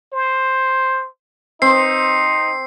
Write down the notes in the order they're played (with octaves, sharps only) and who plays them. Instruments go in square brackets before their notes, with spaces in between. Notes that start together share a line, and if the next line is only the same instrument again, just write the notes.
[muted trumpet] C5
[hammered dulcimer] C4 [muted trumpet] D#4 [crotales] C7